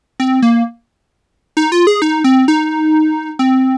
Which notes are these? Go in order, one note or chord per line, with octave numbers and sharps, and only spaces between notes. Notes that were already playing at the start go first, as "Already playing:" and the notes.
C4
A#3
D#4
F4
G#4
D#4
C4
D#4
C4